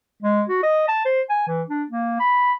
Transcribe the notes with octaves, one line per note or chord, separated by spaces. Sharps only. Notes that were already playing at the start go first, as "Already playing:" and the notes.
G#3
F#4
D#5
A5
C5
G#5
E3
D4
A#3
B5